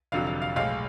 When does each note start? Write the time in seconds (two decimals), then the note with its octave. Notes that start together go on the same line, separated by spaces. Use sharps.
0.12 F1 F2 D3 F#3 F5
0.27 F5
0.42 F5
0.56 B1 A2 G#3 F5